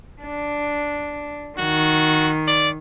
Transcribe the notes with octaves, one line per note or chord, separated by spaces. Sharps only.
D4
D#3 F#4
D5